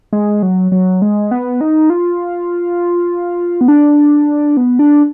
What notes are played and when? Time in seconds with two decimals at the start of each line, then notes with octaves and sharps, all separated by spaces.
0.13 G#3
0.43 F#3
0.72 F#3
1.02 G#3
1.31 B3
1.61 D#4
1.90 F4
3.61 B3
3.68 D4
4.57 B3
4.79 D4